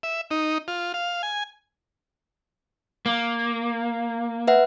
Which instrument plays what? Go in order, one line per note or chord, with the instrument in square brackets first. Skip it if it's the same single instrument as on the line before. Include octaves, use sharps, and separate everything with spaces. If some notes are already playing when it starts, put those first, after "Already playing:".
[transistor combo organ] E5
D#4
F4
F5
G#5
[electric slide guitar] A#3
[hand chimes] B4 E5 F#5